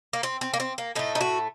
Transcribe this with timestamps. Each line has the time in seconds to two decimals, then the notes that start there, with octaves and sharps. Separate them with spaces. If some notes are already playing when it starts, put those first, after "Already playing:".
0.13 A#3
0.23 C4
0.41 C4
0.53 A#3
0.60 C4
0.78 A#3
0.95 A2 A3 D#4
1.15 D#4
1.21 F#4